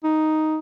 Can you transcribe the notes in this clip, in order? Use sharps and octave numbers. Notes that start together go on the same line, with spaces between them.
D#4